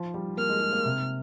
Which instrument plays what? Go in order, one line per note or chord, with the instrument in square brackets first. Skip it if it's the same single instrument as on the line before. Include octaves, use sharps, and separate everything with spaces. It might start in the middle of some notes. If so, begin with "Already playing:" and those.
Already playing: [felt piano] F3
G3
[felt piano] A#3 [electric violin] F6
[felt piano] G#3
G#3
A#3
C3